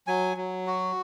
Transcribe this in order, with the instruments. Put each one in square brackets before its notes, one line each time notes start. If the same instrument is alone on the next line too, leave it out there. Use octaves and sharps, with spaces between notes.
[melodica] F#3 G#5
F#3
F#4